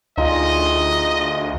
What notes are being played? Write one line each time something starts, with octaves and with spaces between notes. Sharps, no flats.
D2 D#4 F4 G#4 D#5